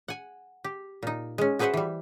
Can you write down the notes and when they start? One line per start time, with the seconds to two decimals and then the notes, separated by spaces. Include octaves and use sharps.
0.08 F#5 G#5
0.64 G4
1.03 A#2 D#4
1.38 G#3 C#4
1.59 F#4 G#4 B4 C5 E5 F#5
1.74 E3 G3